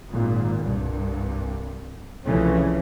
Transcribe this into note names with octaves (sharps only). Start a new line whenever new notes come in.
G#1 A#2
C2 G2
C2 C#3 E3 F3 A3 C#4